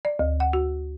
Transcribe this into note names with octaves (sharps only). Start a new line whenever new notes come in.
D5
D2
F#5
F#4